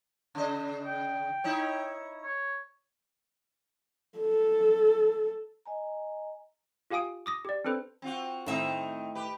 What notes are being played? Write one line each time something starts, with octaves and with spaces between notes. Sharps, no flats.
C#3 D#5
G5
D#4 E4 C#5
C#5
A4
D#5 G#5 A#5
F4 G4 F5 G#5 D#6 D7
D6 D#6 A#6
G4 D5
C4 D4 A4 B4 C5
C4 F4 F#4
A2 D#3 C4 D#4 E5
G4 B4